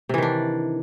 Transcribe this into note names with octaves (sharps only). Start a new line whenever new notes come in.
C3 D#3 E3 D4